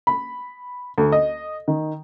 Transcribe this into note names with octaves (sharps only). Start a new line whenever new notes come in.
B5
D2
D#5
D#3